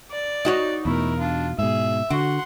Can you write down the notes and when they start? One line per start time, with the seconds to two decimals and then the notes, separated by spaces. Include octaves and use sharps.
0.12 D5
0.45 D#4 F#4 C#5
0.85 E2 B2 A3 E4 A#4
1.19 D4 F4
1.58 G#2 B2 G#4 E5
2.10 D3 F#4 F#5 C6